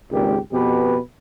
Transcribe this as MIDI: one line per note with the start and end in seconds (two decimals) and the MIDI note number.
0.12 0.38 32
0.12 0.38 37
0.12 0.38 46
0.12 0.38 67
0.53 0.99 41
0.53 0.99 47
0.53 0.99 67
0.53 0.99 71